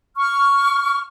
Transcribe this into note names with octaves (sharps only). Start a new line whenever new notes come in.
C#6 F6